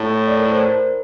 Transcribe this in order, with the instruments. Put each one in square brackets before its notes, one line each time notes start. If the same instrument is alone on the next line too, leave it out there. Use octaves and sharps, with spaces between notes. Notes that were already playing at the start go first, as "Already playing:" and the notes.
Already playing: [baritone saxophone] A2
[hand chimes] D5
A#4
C5
A#4